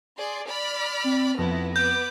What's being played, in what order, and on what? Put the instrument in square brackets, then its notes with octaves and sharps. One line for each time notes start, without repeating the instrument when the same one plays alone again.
[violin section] G#4 D5 C6
D5 B5 F6
[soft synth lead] C4
[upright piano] F2 [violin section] B3 E4 [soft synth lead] A#6
[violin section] B3 B4 D6 [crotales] G6